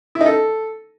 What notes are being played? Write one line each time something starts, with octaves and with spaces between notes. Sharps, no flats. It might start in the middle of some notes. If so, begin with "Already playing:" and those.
E4
D#4
A4